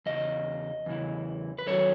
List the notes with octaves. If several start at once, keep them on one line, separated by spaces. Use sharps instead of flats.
E2 C#3 D#5
E2 C#3 E3
B4
F#2 D#3 F#3 A4 C#5